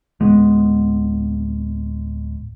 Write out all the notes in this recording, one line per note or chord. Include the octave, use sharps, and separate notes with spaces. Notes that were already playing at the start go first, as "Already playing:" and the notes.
D1 G#3 B3